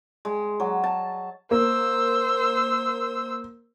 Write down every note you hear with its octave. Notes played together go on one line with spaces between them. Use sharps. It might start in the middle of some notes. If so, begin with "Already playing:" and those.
G#3
F#3
A5
A#3 C5 E6